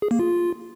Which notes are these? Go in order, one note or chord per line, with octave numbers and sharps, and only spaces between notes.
G#4
A#3
F4